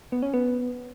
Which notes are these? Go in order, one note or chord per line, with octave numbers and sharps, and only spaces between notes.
B3
C#4
B3